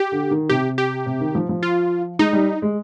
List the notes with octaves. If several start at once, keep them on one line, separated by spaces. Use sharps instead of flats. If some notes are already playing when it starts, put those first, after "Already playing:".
Already playing: G4
D3
D#3
C3 G4
G4
C3
D#3
F3
F3
F4
G#3 D#4
G3
G#3